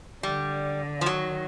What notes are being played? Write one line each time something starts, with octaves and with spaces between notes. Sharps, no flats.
D3 G3
F3
D#3 F#3